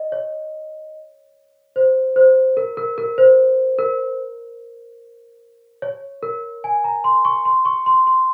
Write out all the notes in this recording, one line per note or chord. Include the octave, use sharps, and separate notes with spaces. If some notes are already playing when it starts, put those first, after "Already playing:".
Already playing: D#5
C#5
C5
C5
A#4
A#4
A#4
C5
A#4
C#5
A#4
G#5
A#5
C6
C#6
C6
C#6
C6
C6